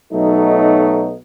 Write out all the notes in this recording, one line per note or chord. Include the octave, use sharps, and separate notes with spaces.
B1 F#3 A3 D#4